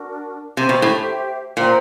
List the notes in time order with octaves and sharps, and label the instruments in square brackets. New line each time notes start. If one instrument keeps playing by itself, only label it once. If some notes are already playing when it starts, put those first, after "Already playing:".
Already playing: [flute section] D4 F#4 A#4
[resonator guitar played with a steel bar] C3 [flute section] G4 C5 E5 G5
[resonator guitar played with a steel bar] B2
A2
[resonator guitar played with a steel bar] A#2 [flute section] C5 E5 G5 A#5